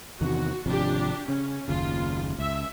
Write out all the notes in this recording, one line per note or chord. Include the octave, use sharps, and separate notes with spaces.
E2 C3 D#3 F#4
G#1 C3 F3 D4 G4
C#3 C#4
F#1 D#2 C#3 F4
C#2 E5